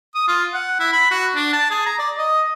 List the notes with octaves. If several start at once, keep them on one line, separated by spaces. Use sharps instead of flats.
D#6
F4
F#5
E4
B5
F#4
D4
A5
G#4
A#5
D5
D#5